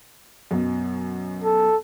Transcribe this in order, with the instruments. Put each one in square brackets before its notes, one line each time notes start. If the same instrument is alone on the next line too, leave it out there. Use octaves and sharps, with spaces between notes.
[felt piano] F#2 B2
[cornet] A4